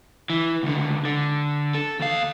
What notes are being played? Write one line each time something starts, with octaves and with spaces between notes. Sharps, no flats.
E3
C#2 D3
D3
A4
D#2 F5